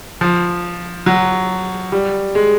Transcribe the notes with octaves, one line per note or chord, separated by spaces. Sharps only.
F3
F#3
G3
G#3